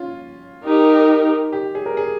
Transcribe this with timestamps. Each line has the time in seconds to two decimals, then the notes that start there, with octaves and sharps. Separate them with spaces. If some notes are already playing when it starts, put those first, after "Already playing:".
Already playing: C#4 F4
0.64 D#4 G4 A#4
1.52 G4
1.75 G#4
1.86 A#4
1.97 G#4